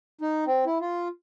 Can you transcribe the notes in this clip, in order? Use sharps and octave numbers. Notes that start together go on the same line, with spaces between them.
D#4
C4
E4
F4